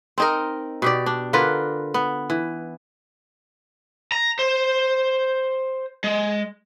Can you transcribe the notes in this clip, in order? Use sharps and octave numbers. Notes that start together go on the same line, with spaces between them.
C4 D#4 A#4
B2 G4 D5
D4
D3 F4 A#4 B4
B3
E3
A#5
C5
G#3